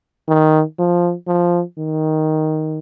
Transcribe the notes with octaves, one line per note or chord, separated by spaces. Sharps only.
D#3
F3
F3
D#3